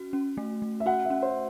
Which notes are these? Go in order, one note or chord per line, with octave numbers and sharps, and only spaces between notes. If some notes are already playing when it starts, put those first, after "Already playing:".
Already playing: C#4 F#4
C#4
A3
A3
E5
F#4 F#5
E5
C#4
C5